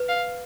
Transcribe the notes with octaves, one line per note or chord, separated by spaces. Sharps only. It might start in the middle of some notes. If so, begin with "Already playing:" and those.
Already playing: B4
F5